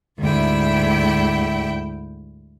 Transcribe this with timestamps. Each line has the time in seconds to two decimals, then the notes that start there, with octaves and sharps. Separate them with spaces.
0.19 D2 G#2 E4 G5